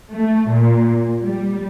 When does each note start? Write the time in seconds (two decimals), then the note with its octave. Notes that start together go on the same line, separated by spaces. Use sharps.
0.13 A3
0.49 A#2
1.23 G3